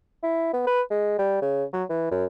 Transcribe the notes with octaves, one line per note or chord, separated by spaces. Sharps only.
E4
B3
B4
G#3
G3
C#3
F#3
E3
F#2